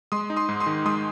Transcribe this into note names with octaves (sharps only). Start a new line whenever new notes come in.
G#3 C6 D#6
D#4
C6 D#6
G#2
C6 D#6
D#3
G#3 C6 D#6